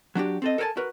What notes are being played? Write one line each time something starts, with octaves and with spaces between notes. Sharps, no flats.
F#3 D4 F#4 G4
C4 A4 D#5
A4 A#4 C5 G#5 A5
F#4 A#4 B4